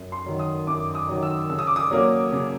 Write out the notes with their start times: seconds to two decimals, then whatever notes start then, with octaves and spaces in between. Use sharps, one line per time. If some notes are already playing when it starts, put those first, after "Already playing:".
Already playing: F#2
0.12 C6
0.26 D#3 F#3
0.39 D#6
0.67 F#2 D6
0.95 D#6
1.09 D#3 F#3
1.23 E6
1.50 C#3 E6
1.59 D#6
1.67 D6
1.76 D#6
1.91 F#3 A#3 C#4
2.32 C#3